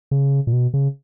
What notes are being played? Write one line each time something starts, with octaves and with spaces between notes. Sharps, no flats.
C#3
A#2
B2
C#3